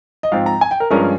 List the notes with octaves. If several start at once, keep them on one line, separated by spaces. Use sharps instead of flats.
D#5
G#2 F3 C4 F5
A#5
G#5
G5
A#4
G2 F3 G#3 C#4 A#4